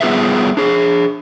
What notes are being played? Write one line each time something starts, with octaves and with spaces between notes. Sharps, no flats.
G3 B3 F4 G#4 B4 E5
D4 G#4